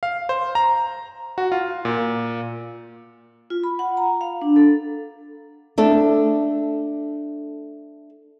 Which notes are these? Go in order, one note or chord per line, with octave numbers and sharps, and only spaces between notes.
F5
C5
A#5
F#4
F4
A#2
F4
B5
F#5
A#5
F5
D4
A4
A3 D4 A4